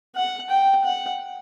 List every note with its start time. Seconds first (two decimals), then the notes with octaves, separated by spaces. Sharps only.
0.16 F#5
0.50 G5
0.84 F#5